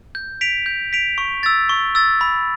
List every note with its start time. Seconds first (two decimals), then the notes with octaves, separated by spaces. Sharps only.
0.15 G6
0.41 B6 D7 F7
0.66 G6
0.93 B6 D7 F7
1.18 C#6
1.43 E6 A6
1.69 C#6
1.95 E6 A6
2.21 B5